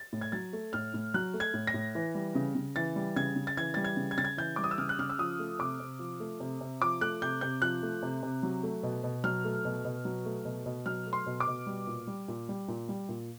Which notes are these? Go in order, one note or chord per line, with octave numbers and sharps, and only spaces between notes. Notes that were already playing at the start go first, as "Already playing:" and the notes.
Already playing: A6
A2
G#6
F#3 A6
A3
A2 F6
A2
F#3 F#6
A3
G#6
A2
A#6
A2
E3
G3
C#3
C#3
E3 A6
G3
C#3 G#6
C#3
A6
E3 G#6
G3 A6
G#6
C#3
G#6
C#3 A6
G#6
E3 G6
G3 D6
D#6
E6
C#3 F6
F#6
C#3 F6
E6
F3 D#6
A3
C3 D6
C3
F3
A3
C3
C3
F3 D6
A3 F#6
C3 G6
C3 G6
F3 F#6
A3
C3
C3
F#3
A3
B2
B2
F#3 F6
A3
B2
B2
F#3
A3
B2
B2
F#3 F6
A3
C6
B2
D6
B2
G3
A#2
G3
A#2
G3
A#2
G3
A#2